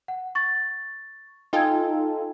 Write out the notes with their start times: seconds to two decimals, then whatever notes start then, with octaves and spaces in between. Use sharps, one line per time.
0.08 F#5
0.35 C#6 A6
1.53 D#4 F4 A4 G5 G#5 G#6